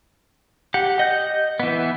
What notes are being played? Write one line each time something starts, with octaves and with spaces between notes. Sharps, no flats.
G4 F#5
D#5 G6
E3 B3